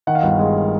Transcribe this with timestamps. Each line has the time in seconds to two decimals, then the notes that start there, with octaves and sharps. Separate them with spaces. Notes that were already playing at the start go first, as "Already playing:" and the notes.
0.07 D#3 F#5
0.15 F5
0.23 G1 F#5
0.39 G#3